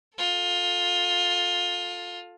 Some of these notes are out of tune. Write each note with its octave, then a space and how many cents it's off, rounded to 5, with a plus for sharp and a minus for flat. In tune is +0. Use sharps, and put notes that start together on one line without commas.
F4 +15 A4 +0